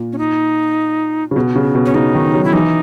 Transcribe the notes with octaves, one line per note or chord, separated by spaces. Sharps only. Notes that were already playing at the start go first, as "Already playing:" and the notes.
Already playing: A#2
C#4
D#4
C#3
B2
C#3
B2
C#4
C#3 D#4
D#3
F#3
E4
E3 D#4